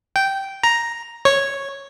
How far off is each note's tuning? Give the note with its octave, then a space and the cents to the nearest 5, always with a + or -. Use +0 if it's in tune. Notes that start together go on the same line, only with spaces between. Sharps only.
G5 -10
A#5 +5
C#5 -5